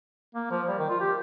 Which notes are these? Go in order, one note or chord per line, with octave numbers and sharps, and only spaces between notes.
A#3
F3
G3
D#3
F4
G4